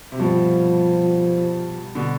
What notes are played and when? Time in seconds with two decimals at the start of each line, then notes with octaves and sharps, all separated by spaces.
0.12 C3
0.19 G2 B2 F3
1.95 B2 D3